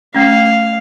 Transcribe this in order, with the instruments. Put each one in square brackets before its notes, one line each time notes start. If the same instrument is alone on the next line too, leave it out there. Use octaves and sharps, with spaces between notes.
[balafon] A3 C#4 [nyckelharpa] F5